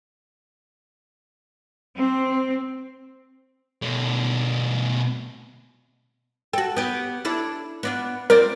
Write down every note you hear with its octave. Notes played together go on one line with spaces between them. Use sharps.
C4
B2 A3
F#4 A4 G5
B3 G4
D4 E4 A4
B3 D4 F4
C4 F4 A#4 D5